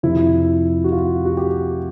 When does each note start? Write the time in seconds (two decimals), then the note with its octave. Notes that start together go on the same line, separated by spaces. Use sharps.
0.03 F2 C3 F3 E4
0.84 F#4
0.92 F4
1.25 F#4
1.37 G4